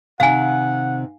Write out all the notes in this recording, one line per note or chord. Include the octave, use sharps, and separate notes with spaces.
C3 D#3 F5 F#5 G#5